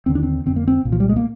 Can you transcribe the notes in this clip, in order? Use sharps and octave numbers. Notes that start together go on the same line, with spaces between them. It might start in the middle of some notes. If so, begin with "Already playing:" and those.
D#2 D3 C4
D4
C4
F2 D3 C4
A#3
C4
C2 A#2
F3
G3
G#3
A#3